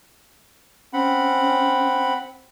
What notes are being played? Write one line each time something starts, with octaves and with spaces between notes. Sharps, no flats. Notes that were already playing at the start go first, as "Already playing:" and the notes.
C4 C#4 F#5 B5